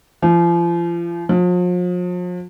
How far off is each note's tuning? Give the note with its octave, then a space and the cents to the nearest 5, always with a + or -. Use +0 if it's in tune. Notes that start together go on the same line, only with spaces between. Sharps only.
F3 -35
F3 +40